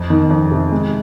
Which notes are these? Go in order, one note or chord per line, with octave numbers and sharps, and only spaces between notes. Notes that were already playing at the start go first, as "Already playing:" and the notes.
Already playing: F2
D#3
F2
C3
G#3